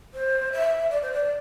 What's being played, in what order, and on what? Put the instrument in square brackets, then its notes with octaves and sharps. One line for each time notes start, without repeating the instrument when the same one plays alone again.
[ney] C5
E5
D5
C5
D5